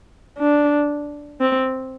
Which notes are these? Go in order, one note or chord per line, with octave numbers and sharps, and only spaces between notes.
D4
C4